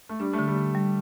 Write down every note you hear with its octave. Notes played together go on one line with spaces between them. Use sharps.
A3
G3 D4
A3
D3
G3
D3
G3